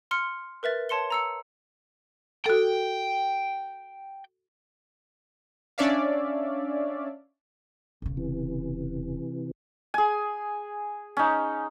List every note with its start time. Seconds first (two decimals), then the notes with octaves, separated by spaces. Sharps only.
0.11 C6 F6 C#7
0.63 A#4 B4 E5 A6
0.89 C#5 A5 C6 C#7 G7
1.11 A#5 E6 C#7
2.46 F#4 A4 G5
5.78 C#4 D4 C#5 D5 E5 F5
8.02 E1 C#3
8.17 C3 E3
9.94 G#4 G#5
11.17 C#4 D#4